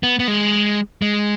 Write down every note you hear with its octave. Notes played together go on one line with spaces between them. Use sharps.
B3
B3
G#3
G#3